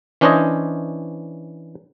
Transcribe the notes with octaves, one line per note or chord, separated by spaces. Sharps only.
E3 C#4 D4 C5 C#5 D#5